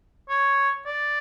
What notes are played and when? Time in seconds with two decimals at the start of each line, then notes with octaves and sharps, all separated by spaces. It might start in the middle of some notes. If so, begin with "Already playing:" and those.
0.30 C#5
0.87 D5